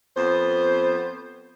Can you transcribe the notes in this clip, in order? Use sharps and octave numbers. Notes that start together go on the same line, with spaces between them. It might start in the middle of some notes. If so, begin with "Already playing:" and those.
F2 B3 C5